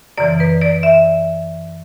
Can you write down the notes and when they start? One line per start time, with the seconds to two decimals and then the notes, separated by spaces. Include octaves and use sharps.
0.17 F#2 C#3 E3 D5
0.40 B4
0.62 D5
0.83 E5